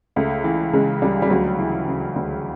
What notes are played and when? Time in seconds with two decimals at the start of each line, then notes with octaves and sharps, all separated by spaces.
0.16 C#2 A3
0.44 E3
0.73 C#3 G#3
1.02 C#2 G3
1.22 G3
1.30 D2 F#3
1.59 E3
1.87 C#3
2.16 D2